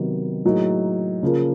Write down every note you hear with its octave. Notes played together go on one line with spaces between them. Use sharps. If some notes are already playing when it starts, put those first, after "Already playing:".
Already playing: C3 D#3 F#3 B3
A2 F#3 A#3 D#4 G#4
C#3 F3 A#3